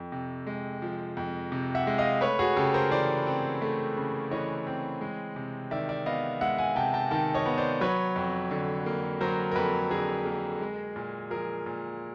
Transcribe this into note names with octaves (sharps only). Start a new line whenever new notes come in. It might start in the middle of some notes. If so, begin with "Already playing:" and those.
Already playing: F2 F3
C3
G#3
F3
F2
C3
E5 F#5
G#3
D#5 F5
A3 B4 C#5
F#4 G#4
C#3 G4 A4
A#4 C5
E3 C5 D5
C4
A3
C#3
E3 C#5 D#5
C4
G#3
C3
D#3 D5 E5
D5 E5
B3 D#5 F5
G#3 E5 F#5
F#5 G#5
C3 G5 A5
G5 A5
D#3 G5 A5
C#5 D#5
B3
C5 D5
F#3 B4 C#5
F2
D3
A#3
F#3 A#4 C5
A#4
F2 A4 B4
D3 G#4 A#4
A#3
G#3
A#2
F3 G#4 A#4
A#2